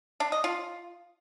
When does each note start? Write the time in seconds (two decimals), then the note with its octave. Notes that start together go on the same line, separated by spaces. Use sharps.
0.20 D4
0.32 D#5
0.44 F4